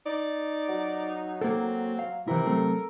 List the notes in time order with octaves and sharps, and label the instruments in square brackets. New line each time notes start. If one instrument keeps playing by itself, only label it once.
[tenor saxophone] D#4 [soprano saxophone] D5
[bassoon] F#3
[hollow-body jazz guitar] A#3 A4 [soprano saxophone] C4
[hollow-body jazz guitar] F5
[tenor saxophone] C3 [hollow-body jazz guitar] E3 E4 [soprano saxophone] A#4
[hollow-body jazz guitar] F#3 A3 C4 [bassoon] A4